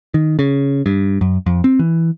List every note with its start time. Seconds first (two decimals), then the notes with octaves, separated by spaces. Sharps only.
0.14 D#3
0.39 C#3
0.86 G2
1.21 F#2
1.46 F2
1.64 C4
1.79 E3